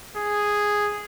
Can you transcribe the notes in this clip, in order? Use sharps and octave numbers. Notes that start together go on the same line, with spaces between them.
G#4